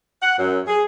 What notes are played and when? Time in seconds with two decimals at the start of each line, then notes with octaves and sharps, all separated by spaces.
0.22 F#5
0.38 F#2
0.66 G#4